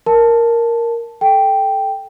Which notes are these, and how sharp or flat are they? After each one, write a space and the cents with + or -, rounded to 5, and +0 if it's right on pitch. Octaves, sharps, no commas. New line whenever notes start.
A#4 +0 A5 -5
A4 -15 G5 +0